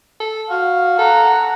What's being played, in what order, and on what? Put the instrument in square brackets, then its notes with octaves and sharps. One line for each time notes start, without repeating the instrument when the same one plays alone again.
[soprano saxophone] A4
[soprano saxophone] F#4 [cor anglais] F5
[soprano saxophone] A4 [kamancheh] F#5 A#5